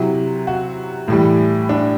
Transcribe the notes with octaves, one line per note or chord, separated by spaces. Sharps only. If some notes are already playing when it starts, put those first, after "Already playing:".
Already playing: C3 F#3 E4
F#4
A2 E3 G3
D4